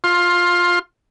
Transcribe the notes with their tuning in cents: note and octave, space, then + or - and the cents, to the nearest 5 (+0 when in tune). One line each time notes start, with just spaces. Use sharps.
F4 +10 C6 +20